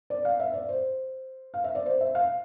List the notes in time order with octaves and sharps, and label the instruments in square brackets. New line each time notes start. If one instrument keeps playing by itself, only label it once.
[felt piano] D5
F5
E5
D5
C5
F5
E5
D5
C5
E5
F5